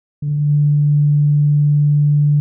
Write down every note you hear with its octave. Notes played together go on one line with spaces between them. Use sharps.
D3